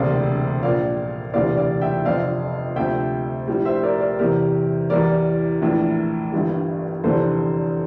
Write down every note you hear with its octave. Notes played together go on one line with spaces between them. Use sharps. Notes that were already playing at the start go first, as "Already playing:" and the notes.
Already playing: E1 D2 C3 D5 F5
A#1 A#2 F3 D5 F5
E1 D2 C3 E3 G3 D5 F5
D5 F5
E5 G5
G1 F2 C3 D5 F5
D2 C3 F3 E5 G5
A#1 A2 G3
C5 E5
A#4 D5
A#4 D5
E2 C3 G3 G4 A#4
E2 E3 G3 A#4 D5
A#1 A2 E3
G1 G2 E3 G3
F1 E2 D3 G3 A4 C5